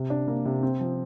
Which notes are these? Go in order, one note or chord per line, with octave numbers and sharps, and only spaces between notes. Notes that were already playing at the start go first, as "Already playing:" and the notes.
Already playing: C3
D4
A#3
C3
C4
F3